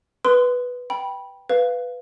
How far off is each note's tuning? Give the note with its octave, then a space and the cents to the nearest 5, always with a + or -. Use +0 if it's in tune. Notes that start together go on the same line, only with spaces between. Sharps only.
B4 +0 C6 -25 D#6 +0
G5 +0 B5 -20
B4 +10 F5 +0